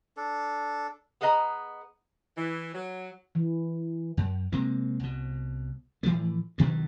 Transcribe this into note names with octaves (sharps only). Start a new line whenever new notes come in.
D4 A4
B3 G#4 B4 D#5 A#5
E3
F#3
E3
F#2
C3 G#3 A#3 C4
C2 B2
A2 E3 F3 A3
G2 B2 D#3 F#3